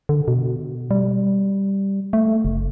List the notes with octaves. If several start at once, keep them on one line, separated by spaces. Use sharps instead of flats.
D3
B2
G3
A3
F#1